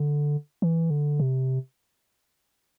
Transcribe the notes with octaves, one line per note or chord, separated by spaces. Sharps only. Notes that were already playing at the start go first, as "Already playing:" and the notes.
Already playing: D3
E3
D3
C3